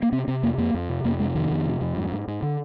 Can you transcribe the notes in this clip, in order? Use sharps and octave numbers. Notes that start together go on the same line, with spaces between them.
A#3
C3 C4
C3 C4
F2 A#3
F2 A#3
F2
C3
F2 A#3
C3 G#3
F2 D#3
F2
C3
F2
G#2
G#2
G#2
D3